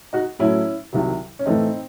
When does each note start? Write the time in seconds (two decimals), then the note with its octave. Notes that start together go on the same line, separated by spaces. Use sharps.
0.13 D#4 F#4
0.39 A2 F#3 A3 C#4 E4
0.93 C2 C3 D#3 F#3
1.39 C#4
1.46 A2 E3 A3 C4 D#4